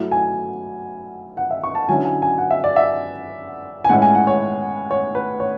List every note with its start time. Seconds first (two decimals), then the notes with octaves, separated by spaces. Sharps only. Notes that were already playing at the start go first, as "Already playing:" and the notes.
Already playing: F#3 A3 E4
0.12 G#5
1.37 F#5
1.51 E5
1.64 C#6
1.75 A5
1.88 D3 F#3 C#4 E4 G#5
2.05 G#5
2.22 G#5
2.38 F#5
2.51 E5
2.64 D5
2.76 E5
3.84 G#5
3.89 A2 G#3 C#4 E4 F#5
4.02 G#5
4.15 F#5
4.27 C#5
4.91 C#5
5.15 B4
5.40 C#5